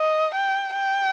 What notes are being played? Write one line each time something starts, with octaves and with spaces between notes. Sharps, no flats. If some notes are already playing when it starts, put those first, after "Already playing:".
Already playing: D#5
G5
G5